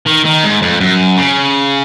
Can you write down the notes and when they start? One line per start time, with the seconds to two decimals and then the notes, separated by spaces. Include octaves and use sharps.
0.06 D#3
0.25 D#3
0.43 G#2
0.62 F2
0.80 F#2
1.18 C#3